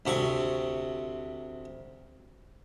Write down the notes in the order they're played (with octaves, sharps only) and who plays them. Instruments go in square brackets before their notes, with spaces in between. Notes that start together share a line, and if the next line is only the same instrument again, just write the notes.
[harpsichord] D2 C3 C#6